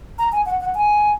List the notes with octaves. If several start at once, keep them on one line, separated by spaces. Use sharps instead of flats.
A#5
G#5
F#5
F#5
G#5